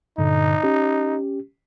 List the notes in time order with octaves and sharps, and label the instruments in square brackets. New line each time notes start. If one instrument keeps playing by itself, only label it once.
[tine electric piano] G2 A#2 D3 [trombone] D#4
[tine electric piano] C#4 G4